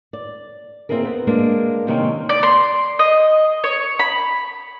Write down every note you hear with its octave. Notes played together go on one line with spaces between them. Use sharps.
D5
A#3 C4 D4 E4 G#4 A#4
B3
G#3 A#3 D4
C3 D#3 A#3 C4 C#4 D#4
D5
C6
D#5
C#5
B5